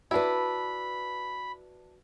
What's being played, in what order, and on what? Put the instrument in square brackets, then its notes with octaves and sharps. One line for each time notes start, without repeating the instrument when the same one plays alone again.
[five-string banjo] D4 E4 [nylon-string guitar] F#4 B4 [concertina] B5